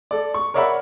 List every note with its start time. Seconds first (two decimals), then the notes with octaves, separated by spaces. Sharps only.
0.11 A4 D5
0.34 C#6
0.54 A#4 C#5 D5 E5 F#5 B5